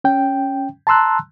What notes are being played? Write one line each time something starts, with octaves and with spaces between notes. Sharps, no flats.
C#4 G5
A5 A#5 C6 E6 F#6